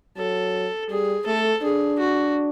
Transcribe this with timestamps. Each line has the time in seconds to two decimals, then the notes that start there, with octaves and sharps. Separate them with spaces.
0.17 F#3 A4
0.90 G3 G#4
1.26 A3 A4
1.63 D4 G#4
1.99 F#4